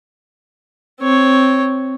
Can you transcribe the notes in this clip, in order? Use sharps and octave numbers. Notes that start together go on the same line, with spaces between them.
C4 C#5